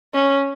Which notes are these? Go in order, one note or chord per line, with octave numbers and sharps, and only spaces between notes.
C#4